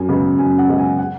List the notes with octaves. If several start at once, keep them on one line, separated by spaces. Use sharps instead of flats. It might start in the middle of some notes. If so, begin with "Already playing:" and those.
Already playing: F#2 G#5
C#3 G#3 B3
F#2 G#5
F#5
C#3 G#3 B3
G#5
F#5